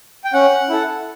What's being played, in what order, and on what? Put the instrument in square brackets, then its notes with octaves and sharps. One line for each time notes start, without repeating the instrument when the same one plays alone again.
[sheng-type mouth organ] G5
C#4 F#5
E4 A4